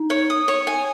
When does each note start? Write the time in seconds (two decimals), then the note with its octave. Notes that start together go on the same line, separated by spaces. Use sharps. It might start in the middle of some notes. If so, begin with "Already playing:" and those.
Already playing: D#4
0.10 C#5
0.30 D#6
0.48 C#5
0.67 G#5